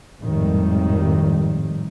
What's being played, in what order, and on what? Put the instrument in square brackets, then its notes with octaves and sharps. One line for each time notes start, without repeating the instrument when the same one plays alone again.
[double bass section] G#1 F2 A2 D#3 G3